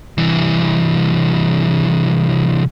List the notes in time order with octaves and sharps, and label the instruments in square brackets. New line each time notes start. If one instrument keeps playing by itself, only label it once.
[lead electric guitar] C2 E3